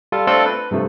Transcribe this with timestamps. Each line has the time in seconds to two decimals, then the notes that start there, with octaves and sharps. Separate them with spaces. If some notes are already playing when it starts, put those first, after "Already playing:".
0.12 G3 F4 A4
0.27 A3 C4 D4 F4 A4
0.46 B4
0.71 G2 C3 F3 A3